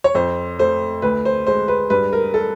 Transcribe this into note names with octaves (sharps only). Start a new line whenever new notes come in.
C#5
F2 C5
A3 C5
D2 B4
C5
G#3 C5
B4
G2 B4
A#4
A4